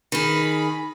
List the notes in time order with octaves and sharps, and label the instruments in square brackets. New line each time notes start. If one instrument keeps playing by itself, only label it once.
[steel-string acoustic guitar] D#3 G#4 [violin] B5